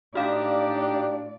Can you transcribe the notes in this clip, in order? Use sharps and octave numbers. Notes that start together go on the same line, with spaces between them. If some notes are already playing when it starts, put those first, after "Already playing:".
A2 D4 D#4 F#4 G4 D5 F5